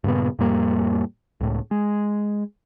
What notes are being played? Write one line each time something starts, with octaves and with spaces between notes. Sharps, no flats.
G2 A#2 C#3 B3
F2 A2 G3 A#3
C#2 A2
G#3